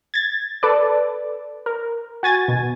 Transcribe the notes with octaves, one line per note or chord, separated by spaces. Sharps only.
G#6 A6
A4 B4 D5
A#4
F#4 G#5 G#6 A6
B2